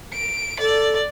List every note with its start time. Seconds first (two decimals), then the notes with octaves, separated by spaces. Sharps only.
0.14 D7
0.60 A4 D5